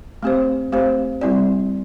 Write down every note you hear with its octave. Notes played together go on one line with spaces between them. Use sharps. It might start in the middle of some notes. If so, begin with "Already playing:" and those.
A3 C4 G4 C5
A3 C4 G4 C5
G3 C4 E4 G4 D5